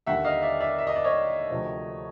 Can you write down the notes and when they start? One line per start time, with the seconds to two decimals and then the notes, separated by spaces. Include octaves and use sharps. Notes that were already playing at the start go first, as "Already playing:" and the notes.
0.06 D#2 D3 G3 E5 F#5
0.24 D#5 F5
0.42 D5 E5
0.60 D5 E5
0.78 E5
0.87 D#5
0.96 D5
1.04 C#5 D#5
1.50 D2 C3 F3